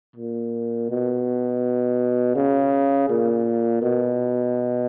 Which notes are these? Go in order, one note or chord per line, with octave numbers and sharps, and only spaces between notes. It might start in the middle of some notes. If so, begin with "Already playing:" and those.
A#2
B2
C#3
A#2
B2